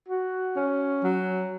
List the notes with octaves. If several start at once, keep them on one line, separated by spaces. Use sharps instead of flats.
F#4
C#4
F#3